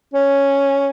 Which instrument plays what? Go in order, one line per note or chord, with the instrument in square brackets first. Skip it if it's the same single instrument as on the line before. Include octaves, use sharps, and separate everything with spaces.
[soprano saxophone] C#4